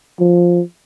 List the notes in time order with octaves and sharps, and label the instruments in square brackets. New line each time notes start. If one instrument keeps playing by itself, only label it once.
[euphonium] F3